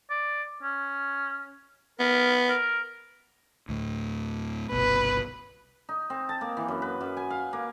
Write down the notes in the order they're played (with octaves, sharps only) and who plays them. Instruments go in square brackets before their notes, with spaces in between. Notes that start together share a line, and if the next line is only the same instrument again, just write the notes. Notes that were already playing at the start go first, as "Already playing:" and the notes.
[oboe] D5
C#4
[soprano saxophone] B3 [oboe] A#4
[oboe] A#4
[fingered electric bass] D2 A2
[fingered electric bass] G1 C2 B2 [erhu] B4
[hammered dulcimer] D#4
C4
A5
A#3
E3
F#2
B4
F#2
G#5
F5
A#3